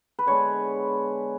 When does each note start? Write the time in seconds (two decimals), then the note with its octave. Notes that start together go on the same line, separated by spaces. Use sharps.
0.19 B4
0.26 D3 G#3 B3 C#5